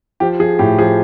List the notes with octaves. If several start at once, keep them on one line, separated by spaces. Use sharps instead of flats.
F3 G4
F3 G#4
A2 G4
F3 G#4